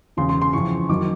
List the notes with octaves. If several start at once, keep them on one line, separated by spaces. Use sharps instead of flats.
E1 E2 C#3 C6
C6
C6
F2 C#3 E3 C#6
F#1 F#2 D#3 D6